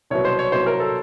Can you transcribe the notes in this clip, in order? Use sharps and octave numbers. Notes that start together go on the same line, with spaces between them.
C2 B2 F#3 C#5
C5
C#5
C2 B2 F#3 C5
A#4
A4